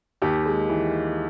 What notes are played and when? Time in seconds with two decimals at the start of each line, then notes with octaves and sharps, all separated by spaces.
0.22 D#2 G4
0.46 G#3
0.69 E3